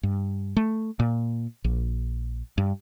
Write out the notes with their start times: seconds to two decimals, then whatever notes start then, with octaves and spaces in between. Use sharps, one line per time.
0.03 G2
0.57 A3
1.00 A#2
1.64 A#1
2.58 G2